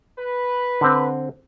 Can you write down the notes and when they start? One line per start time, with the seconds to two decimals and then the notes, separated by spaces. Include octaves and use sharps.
0.18 B4
0.81 D3 C4